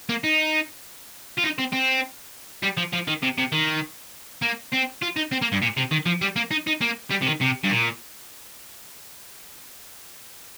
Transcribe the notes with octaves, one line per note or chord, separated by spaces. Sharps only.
A#3
D#4
F4
D#4
C4
C4
G3
F3
F3
D#3
C3
C3
D#3
A#3
C4
F4
D#4
C4
A#3
G2
A#2
C3
D#3
F3
G3
A#3
D#4
D#4
A#3
G3
C3
D#3
C3
G2
A#2